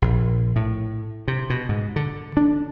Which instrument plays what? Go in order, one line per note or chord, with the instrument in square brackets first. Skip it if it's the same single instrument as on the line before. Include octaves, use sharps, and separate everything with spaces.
[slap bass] A#1
A2
C3
B2
G#2
D3
D4